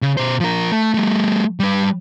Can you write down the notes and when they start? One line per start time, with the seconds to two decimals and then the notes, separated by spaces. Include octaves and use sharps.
0.02 C#3
0.17 B2 C5
0.40 F3 A#4
0.71 A3
0.94 G3 A3
1.60 G3 B4